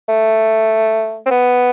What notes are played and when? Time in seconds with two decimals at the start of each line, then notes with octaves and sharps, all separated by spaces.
0.09 A3
1.26 C4
1.31 B3